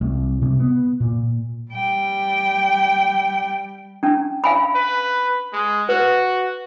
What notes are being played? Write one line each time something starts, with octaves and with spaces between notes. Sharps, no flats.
C2
C3
B3
A#2
G3 G5
C#4 D4
F5 G#5 B5
B4
G#3
F#4 B4